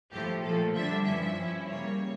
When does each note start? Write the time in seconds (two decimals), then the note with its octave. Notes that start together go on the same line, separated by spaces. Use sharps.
0.12 A2 F3 A3 G4
0.43 A#2 F3 A3 A4
0.74 D3 G3 D4 E5
1.05 G2 F3 C#4 E4 E5
1.37 G2 F3 C#4 E4
1.67 C#3 G3 A#3 C#5